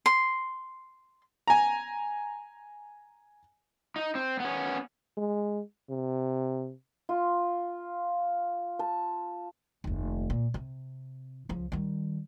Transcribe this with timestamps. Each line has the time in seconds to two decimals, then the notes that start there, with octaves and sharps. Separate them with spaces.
0.06 C6
1.47 G#5 A#5
3.96 D#4
4.15 C4
4.40 B3 C#4
5.17 G#3
5.90 C3
7.09 F4
8.79 A5
9.84 F1 D#2
10.30 A#2
10.54 C3
11.49 C#2 F3
11.72 D#3 G3